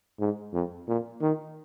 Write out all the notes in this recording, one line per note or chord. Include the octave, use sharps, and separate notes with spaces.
G#2
F2
A#2
D#3